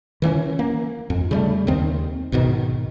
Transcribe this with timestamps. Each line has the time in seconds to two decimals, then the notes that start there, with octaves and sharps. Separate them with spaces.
0.22 D#3 E3 B3 C#4
0.59 A#3
1.10 F2
1.31 C#3 G3 A3
1.67 D#2 D#3 C4
2.32 B1 G#2 B2 D#3